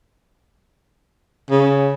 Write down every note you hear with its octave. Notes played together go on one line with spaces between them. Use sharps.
C#3